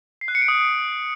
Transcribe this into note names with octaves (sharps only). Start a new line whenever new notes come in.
C7
F#6
C#7
D7
D#6